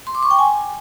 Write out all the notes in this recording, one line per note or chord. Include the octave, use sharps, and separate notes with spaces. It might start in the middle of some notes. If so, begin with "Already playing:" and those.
C6
D6
C#6
G5
G#5